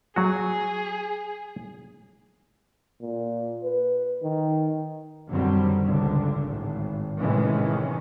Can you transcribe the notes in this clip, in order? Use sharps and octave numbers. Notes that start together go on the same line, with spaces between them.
F#3 F#4 G#4
A#2
B4
D#3
F#2 D3 D#3 F#3 G3 C4
G#1 C#2 D3
G#1 A2
A2 C3 D#3 E3 G#3 C#4